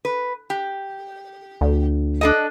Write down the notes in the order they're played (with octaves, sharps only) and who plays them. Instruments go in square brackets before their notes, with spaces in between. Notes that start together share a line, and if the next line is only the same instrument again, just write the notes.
[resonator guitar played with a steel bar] B4
G4
[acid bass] D2
[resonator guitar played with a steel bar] D4 A4 D#5